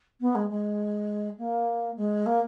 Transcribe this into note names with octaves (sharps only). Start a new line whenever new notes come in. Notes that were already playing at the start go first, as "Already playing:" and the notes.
B3
G#3
G#3
A#3
G#3
A#3